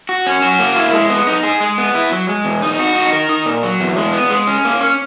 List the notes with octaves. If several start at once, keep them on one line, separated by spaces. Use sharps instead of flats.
F#4
C#4
F#4
A#3
E4
G#3
B3
D#4
G#4
G#3
B3
E4
F#3
G#3
E2
D#4
F#4
D#4
A#4
D#4
A#2
F#3
E2
G#3
B3
G#3
C#4
A#3
C#4